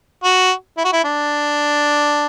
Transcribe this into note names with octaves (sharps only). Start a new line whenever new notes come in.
F#4
E4
F#4
E4
D4